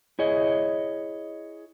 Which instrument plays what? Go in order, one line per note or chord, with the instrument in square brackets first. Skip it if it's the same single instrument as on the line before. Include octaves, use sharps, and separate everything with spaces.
[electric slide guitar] E4 G#4 C#5 D#5